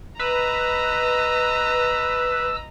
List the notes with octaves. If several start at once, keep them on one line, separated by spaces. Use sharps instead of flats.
B4 D#5 A#5 E6